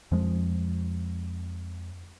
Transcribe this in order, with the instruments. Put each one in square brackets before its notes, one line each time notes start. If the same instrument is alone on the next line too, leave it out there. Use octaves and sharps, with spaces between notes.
[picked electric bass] F2 F3 G#3